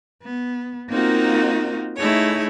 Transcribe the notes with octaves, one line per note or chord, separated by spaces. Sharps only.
B3
A#3 C4 D#4 F4 F#4 A#4
A3 D#4 E4 G#4 C#5